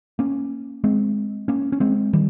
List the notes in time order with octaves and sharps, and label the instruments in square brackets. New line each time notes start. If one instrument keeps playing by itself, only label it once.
[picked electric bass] A#3 C#4
G#3 C4
A#3 C#4
C#4
G#3 C4
D#3 G3